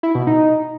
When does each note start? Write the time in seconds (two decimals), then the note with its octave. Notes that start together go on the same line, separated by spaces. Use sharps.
0.03 E4
0.15 B2
0.27 D#4